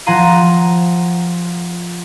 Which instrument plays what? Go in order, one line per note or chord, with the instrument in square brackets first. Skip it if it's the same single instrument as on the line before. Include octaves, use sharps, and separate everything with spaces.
[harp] F3 F#5 G#5 A#5 C6 D#7